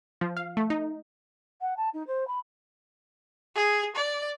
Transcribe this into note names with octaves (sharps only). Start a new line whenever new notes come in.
F3
F5
A3
D#4
F#5
A5
D#4
C5
B5
G#4
D5